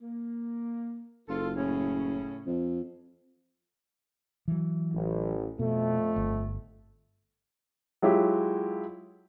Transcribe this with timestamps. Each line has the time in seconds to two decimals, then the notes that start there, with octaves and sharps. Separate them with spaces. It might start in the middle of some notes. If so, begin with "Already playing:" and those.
0.02 A#3
1.29 F#1 F4 A4
1.57 A2 C#3 C#4
2.46 F2
4.48 E3 F#3
4.94 A1
5.59 F2 B2 A3
6.16 G1
8.02 F#3 G#3 E4 F4 G4